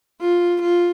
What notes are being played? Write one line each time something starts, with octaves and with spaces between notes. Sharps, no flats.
F4
F4